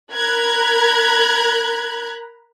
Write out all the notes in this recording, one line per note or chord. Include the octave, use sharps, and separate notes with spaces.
A#4 A#5 B5 F#6 G#6